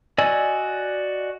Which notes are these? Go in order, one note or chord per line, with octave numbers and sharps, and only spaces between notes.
F#4 D5 D#5 G#5 E6